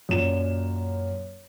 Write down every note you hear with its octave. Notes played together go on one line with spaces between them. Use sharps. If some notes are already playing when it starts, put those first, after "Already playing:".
F#2 A#2 E7